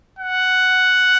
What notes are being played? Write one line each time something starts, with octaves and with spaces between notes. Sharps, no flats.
F#5